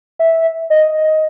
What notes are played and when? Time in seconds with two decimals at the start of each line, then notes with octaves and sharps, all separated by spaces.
0.19 E5
0.70 D#5